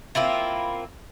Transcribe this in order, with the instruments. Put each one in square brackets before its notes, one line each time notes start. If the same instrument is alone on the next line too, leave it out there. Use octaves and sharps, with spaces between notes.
[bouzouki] A#3 C4 E4 F4